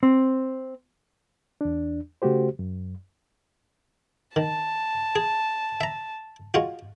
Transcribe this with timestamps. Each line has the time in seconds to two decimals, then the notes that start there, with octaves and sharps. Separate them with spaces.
0.03 C4
1.61 E2 D4
2.22 C#3 A3 F#4 G4 C5
2.59 F#2
4.36 D#3 A5
5.16 G#4
5.81 E5 A#5
6.54 G#3 F4 F#4